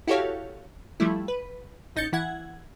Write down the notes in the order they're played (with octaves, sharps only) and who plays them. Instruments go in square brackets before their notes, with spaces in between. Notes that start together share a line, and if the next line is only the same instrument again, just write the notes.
[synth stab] E4 F#4 G4 A4 C#5 F5
F3 G3 A3 E4
B4
A1 D#4 G6 A6 C#7
E3 E4 F#5 G#6